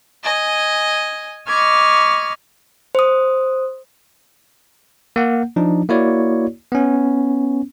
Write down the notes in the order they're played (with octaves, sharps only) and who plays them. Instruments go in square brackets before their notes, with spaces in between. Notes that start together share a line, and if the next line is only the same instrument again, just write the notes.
[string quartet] D#5 G#5
D#5 B5 C#6 D6 F6 G#6
[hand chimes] C5 D#6
[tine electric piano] A#3 F#5
F3 D4 D#4
A#3 E4 F#4 C#5 D5
B3 C#4